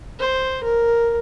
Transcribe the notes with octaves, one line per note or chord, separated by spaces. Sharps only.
C5
A#4